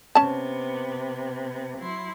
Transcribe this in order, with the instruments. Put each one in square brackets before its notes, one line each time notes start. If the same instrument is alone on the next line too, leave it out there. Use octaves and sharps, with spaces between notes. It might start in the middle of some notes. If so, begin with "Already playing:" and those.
[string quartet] C3 B3 [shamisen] C#4 A5
[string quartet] F#3 E4 C6